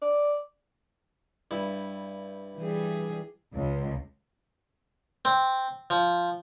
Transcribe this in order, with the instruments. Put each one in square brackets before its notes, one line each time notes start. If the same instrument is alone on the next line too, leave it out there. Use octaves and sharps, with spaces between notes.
[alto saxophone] D5
[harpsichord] G2 E4
[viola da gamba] E3 G3 G#4
[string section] C#2
[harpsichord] C4
F3